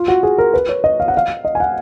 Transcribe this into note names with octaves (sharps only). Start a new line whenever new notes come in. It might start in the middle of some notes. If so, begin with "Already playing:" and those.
Already playing: F4
F#4
G#4
A#4
B4
C#5
D#5
F5
F#5
F5
D#5
G#5
F#5